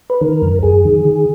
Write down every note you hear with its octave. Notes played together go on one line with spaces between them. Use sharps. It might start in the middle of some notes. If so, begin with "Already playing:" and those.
B4
D#3 A#4
F#2
F#2 G#4
D#3
D#3